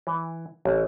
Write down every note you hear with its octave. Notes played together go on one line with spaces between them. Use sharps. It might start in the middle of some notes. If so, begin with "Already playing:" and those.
E3
A1